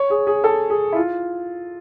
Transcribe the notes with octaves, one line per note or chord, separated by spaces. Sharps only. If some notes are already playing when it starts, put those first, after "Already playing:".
Already playing: C#5
G#4
G#4
A4
G#4
E4
F4